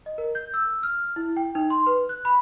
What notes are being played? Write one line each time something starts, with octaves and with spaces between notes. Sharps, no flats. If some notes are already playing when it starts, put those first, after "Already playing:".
D#5
A#4
G6
E6
F6
E4
G5
D#4
C6
B4
F#6
B5